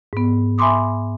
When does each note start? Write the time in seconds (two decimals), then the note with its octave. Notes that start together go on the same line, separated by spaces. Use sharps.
0.13 G#2 B3
0.58 E5 G#5 B5 C6 D6 D#6